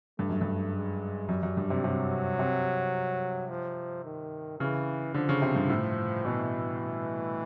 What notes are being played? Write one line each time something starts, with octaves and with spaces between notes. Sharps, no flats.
G2 A3
F#2
G2
G#3
F#2 G3
F#2
G2
C3
C3 F#3
C3
F3
D#3
C#3 E3
D3 F3
C#3
C3
G2
A2
B2 E3